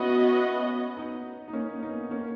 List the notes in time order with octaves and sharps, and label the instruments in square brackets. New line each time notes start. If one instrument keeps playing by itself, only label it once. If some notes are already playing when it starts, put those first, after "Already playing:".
Already playing: [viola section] B3 F#4 B4 D#5 [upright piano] C#4 E4
[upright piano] B3 D#4
D#4
A#3 C#4
B3 D#4
A#3 C#4